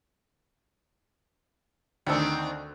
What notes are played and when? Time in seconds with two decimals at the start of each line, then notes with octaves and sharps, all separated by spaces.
2.07 D2 D#3 C4 D4 E6